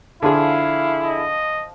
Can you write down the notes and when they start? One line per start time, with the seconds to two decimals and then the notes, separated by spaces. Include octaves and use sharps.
0.22 D3 F3 E4 G#4 F5
1.04 D#5